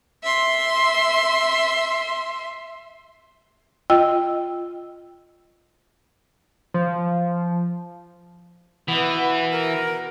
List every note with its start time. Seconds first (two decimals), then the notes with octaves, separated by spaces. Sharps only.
0.24 E5 C6
3.90 F4 D#5 G5 E6
6.74 F3
8.88 B2 E3 B3 B5
9.51 A#4